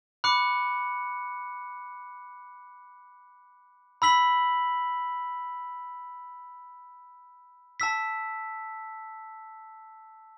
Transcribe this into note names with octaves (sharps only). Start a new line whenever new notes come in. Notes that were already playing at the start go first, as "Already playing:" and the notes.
B5 D6 F#6 C#7
B5 E6 B6 F#7
A5 E6 B6